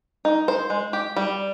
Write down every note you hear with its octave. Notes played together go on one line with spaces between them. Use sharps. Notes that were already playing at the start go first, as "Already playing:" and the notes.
D#4
C5
G#3
G4
G3